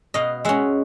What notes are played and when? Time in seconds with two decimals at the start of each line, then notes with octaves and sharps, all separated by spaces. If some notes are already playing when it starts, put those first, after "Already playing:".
0.14 B2 D#5 F5
0.45 G#3 C#4 E5 F#5